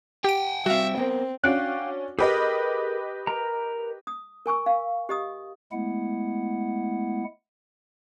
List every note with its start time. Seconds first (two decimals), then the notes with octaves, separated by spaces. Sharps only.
0.24 G4 F#5 G5 D7
0.66 G3 C4 F#4 E5 F5
0.98 B3 C4 A#4 C5
1.44 C#4 D4 F#4 F5 G5 F#6
2.19 G4 G#4 A#4 B4 D#5
3.27 A#4 A#5
4.07 D#6
4.46 A#4 G#5 C#6 E6
4.66 F5
5.09 G4 D#5 D#6
5.72 G#3 A3 B3 E4 F#5